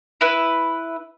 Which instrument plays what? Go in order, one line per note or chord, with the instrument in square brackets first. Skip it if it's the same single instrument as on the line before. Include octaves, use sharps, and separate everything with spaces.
[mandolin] E4 B4